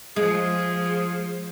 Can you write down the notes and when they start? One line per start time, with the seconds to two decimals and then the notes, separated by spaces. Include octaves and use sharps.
0.16 F3 G#3 G#4